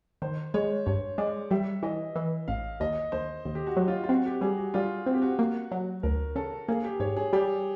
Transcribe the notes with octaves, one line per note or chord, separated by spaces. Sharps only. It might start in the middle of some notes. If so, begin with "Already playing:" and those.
D#3 C5
G#3 C#5
G2 C#5
G#3 D5
G3 E5
E3 D#5
E3
A1 F5
D#2 D#5
D#2 C5
D#2
G4
F#4
F#3
F4
F4
C4 F#4
G4
G3 G#4
F#4
G3 F4
C4 F#4
G4
F#4
A#3
F#3
D2 A#4
C#3 A4
A#3 G#4
G4
G#2 C#5
G#4
G3 G4